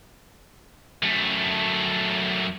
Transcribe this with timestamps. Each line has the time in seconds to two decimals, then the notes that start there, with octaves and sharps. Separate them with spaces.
1.03 F#2 A3